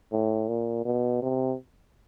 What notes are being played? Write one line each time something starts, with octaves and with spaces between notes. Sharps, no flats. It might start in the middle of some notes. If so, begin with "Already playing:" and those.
A2
A#2
B2
C3